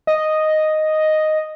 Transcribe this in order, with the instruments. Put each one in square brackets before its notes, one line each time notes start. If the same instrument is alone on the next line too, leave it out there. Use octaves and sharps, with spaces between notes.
[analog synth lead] D#5